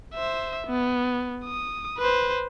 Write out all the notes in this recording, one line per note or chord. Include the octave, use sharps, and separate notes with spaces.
C5 E5
B3
D#6
B4 C5